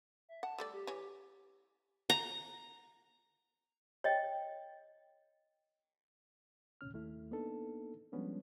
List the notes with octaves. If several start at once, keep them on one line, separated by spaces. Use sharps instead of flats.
E5
F#5 A5
G3 A3 D5 E6
G4
E3 C#5
A#5
C#5 D#5 G5
D2 A2 C3 C#4 F6
D#2 A3 E4
A#3 B3 D4 D#4 A4
F3 G3 G#3 B3 C#4 D4